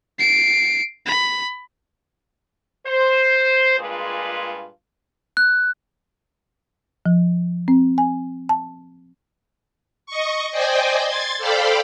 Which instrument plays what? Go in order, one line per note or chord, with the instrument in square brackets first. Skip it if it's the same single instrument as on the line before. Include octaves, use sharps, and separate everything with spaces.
[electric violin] C7 D7
B5
[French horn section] C5
G2 A#2 G#3 F4 G#4 B4
[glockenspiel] F#6
[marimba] F3
C4
G#5
A5
[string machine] D#5 C#6
C5 D5 D#5 G5 G#5
C6 G#6 A6
A4 C5 D5 F5 G5 B5